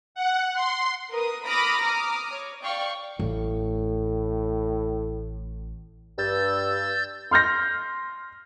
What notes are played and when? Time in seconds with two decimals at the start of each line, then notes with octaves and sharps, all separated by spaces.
0.15 F#5
0.54 C6
1.12 A#4 B4 D#6
1.47 B5 D6 D#6 F6 A#6
1.82 A#5 D6 D#6 F6
2.34 C#5
2.63 D5 F5 G5 C#6
3.19 A1 A2
6.18 G2 E6 G6 A6
7.31 C6 F6 G6 A#6